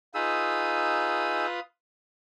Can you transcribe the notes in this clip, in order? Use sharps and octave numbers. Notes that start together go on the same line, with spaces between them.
D#4 F4 G#4 B4 D#6 E6